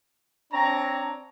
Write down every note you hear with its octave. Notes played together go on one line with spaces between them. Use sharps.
C4 D4 C#5 A#5